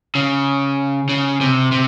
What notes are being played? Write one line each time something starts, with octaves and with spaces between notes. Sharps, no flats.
C#3
C#3
C3
C3